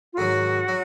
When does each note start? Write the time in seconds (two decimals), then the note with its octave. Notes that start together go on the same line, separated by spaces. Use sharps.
0.13 F4
0.17 G#2 D#3 F#3 F#4
0.68 F#3